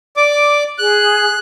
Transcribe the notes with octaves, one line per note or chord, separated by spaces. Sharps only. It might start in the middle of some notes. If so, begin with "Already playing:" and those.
D5 D6
G#4 F#6